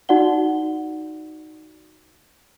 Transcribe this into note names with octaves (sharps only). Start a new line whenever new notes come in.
D#4 F#4 D5 F#5 G7